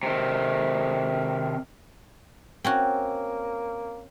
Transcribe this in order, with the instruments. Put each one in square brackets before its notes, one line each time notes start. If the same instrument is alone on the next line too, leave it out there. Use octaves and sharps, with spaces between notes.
[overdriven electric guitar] C3 D#3
[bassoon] A#3 [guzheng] C4 C#4 F#4